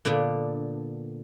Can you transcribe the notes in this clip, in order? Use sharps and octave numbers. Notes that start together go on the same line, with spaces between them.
A#2 D3 B3 D4